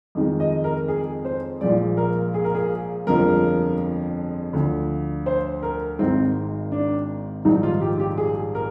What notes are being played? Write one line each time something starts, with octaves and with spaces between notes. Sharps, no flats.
F2 D#3 G#3
D#5
A#4
G#4
C5
A#1 A#2 F3 G#3 D5
A#4
G#4
A#4
G#4
G1 F2 D3 F3 G#3 A#4
D2 D3 F3
C5
A#4
G#1 G#2 D#3 C4
D4
A#1 G#2 D#3 G3 D#4
F4
G4
G4
G#4
A#4